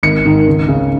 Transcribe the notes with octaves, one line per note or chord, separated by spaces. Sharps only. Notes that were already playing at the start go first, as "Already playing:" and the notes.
G#1 C#7
G#2 D#3
C#2
C#3